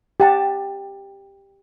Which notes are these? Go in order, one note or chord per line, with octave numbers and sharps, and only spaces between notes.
G4 F#5 A5